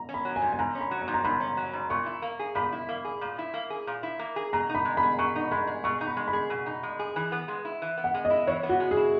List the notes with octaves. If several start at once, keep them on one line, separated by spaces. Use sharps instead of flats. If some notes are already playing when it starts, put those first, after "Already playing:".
Already playing: A#5
C#4
B5
F#3
G#5
G#2
G#5
G#2 A#5
C#4
B5
F#3
A#5
G#2
A#5
G#2 B5
C#4
F#3
G#2
A#2 C#6
E4
A#3
G#4
A#2 B5
E4
A#3
G#4
A#2
E4
A#3
G#4
A#2
E4
A#3
G#4
B2 A#5
D#4
B5
G#3
B5
G#4
B2 C#6
D#4
G#3 B5
G#4
B2 C#6
D#4
B5
G#3
B5
G#4
B2
D#4
G#3
G#4
E3
B3
G#3
E4
E3
B3
F#5
G#3
D#5
E4
E3 C#5
B3
F#4
G#3
G#4
E4